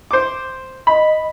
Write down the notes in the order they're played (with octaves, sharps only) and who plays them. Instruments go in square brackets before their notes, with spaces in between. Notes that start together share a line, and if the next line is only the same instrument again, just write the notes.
[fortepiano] C5 D6
[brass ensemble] D#5 [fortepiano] B5